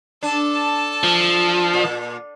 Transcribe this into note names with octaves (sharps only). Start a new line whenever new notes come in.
D4 A4 A5
F3
A#2